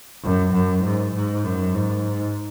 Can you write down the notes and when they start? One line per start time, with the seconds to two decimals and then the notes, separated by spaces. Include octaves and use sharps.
0.24 F#2
0.53 F#2
0.84 G#2
1.14 G#2
1.44 F#2
1.74 G#2